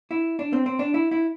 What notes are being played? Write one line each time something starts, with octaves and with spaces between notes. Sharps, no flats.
E4
D4
C4
C4
D4
E4
E4